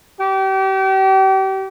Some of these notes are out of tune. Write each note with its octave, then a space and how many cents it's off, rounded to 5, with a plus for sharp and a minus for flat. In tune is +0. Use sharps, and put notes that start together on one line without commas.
G4 -35